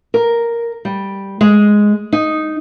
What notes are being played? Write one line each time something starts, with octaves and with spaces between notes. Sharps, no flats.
A#4
G3
G#3
D#4